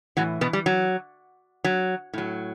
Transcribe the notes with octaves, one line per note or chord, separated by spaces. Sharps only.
A2 E3 F#3 F#4
B2 B3
G3
F#3
F#3
A2 F#3